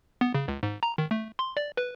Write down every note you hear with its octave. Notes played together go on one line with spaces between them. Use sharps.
B3
C#3
C#2
G#2
A#5
D#3
A3
C6
D5
B4